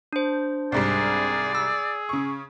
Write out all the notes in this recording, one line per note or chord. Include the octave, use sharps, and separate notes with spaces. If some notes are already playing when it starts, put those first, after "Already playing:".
D4 C5
C2 G#2 G3 G#4 D5
G#4 E6
C#3 C#6